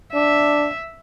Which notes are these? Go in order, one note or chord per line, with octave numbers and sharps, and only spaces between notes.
D4 E5